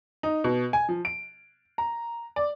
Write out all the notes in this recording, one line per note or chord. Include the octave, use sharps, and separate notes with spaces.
D#4
B2
G#5
F3
D7
A#5
D5